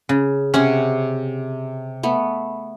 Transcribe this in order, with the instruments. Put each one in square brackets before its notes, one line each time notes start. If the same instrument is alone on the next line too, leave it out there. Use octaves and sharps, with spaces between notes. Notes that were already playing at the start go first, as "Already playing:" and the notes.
[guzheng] C#3
[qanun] C3 F#5 G#5 [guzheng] C#4
[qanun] A3 B3